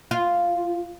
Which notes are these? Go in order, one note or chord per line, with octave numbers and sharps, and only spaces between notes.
F4